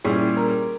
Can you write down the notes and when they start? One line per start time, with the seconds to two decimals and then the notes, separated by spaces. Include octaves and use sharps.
0.04 A#2 G3 C#4 E4 G#4
0.37 A#4